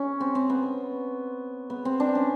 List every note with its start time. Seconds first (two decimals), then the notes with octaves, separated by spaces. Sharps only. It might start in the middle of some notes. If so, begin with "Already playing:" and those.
Already playing: C#4
0.20 C4
0.35 C4
0.50 B3
1.70 B3
1.85 C4
2.00 D4
2.15 C#4